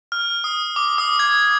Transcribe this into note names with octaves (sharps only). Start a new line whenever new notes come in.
F6
D#6
D6
D#6
G#6